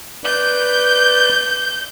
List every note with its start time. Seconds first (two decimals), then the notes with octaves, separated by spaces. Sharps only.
0.24 B4 D5 G6